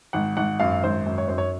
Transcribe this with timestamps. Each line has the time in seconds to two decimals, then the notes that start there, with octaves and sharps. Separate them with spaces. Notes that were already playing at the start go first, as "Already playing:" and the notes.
0.13 G#1 F#5
0.37 G#1 F#5
0.60 F#2 F5
0.83 G#1 C5
1.06 F#2
1.18 C#5
1.28 F#2 C5
1.38 C#5